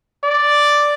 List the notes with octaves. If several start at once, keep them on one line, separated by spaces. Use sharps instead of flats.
D5